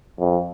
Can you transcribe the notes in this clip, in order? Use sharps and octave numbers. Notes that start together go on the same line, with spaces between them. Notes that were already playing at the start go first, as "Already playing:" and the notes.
F2